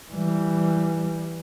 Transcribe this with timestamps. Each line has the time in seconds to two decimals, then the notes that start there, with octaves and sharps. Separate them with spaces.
0.12 E3 G3